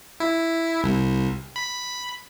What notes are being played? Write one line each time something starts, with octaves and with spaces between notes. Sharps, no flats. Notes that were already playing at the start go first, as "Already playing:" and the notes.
E4
C2
B5